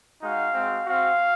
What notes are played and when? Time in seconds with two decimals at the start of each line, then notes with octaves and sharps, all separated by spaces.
0.22 G#3 D#4 F#4 F5
0.54 G#3 C4 F#4
0.86 C4 F#4 F5